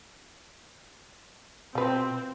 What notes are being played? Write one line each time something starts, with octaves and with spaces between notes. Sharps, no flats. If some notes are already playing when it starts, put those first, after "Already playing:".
B2 F3 C4 B4